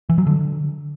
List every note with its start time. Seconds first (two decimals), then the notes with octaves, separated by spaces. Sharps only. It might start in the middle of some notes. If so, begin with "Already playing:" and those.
0.09 E3
0.18 F#3
0.27 D3